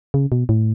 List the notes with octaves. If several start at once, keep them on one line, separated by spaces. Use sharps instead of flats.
C#3
B2
A2